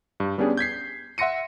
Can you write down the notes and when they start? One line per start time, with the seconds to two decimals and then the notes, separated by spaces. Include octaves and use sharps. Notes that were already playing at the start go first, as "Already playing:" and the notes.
0.20 G2
0.38 G3 B3 C#4 D4 G4 G#4
0.57 G6 G#6 B6 C7
1.18 E5 F#5 C6 A#6 C#7 D#7